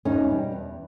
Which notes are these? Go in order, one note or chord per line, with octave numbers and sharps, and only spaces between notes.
E2 C#4 D#4
B2 G3
E2